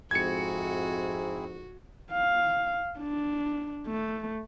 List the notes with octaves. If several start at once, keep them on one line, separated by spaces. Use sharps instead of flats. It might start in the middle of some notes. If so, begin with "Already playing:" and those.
F2 G#2 C4 E4 F#4 G#4 G#6 C#7
F5
D4
A3